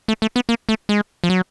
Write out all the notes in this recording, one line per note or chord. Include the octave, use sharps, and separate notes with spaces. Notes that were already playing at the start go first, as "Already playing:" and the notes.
A3
A3
B3
A#3
A3
G#3
F3
F#3